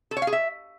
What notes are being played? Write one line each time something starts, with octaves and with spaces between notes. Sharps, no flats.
A4
C#5
F5
G#4
E5